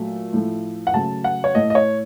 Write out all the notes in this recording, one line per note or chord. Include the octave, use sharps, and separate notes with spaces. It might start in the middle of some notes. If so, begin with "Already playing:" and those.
Already playing: A#2 F#3 A3
A2 F3 A3
F#5
C#3 F#3 A3 A5
F#5
C#5
A2 A3 D#5
D#5
C#5